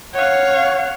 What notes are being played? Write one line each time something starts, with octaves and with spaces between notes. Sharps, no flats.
C#5 F5 F#5